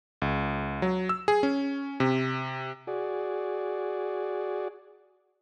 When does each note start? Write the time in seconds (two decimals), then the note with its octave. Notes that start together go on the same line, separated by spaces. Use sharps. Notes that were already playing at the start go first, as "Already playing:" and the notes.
0.22 C#2
0.82 F#3
1.09 E6
1.28 G#4
1.43 C#4
2.00 C3
2.87 F#4 G#4 D5